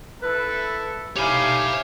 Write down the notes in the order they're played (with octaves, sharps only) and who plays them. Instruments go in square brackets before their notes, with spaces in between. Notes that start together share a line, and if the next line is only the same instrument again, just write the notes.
[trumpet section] E4 A4 [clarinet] B4
[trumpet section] A3 D#4 F5 [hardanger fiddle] E4 G#5 [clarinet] G4 [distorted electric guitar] C#5 B5